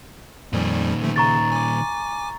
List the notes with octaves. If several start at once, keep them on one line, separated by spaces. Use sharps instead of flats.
F2 A#2 D#3 F3 G3
D3 F3 A3
C#3 A#5 C#6 A6
G#5 D6